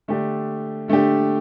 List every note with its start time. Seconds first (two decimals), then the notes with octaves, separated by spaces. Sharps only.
0.08 D3 A3 D4 G4
0.88 D3 A3 D4 G4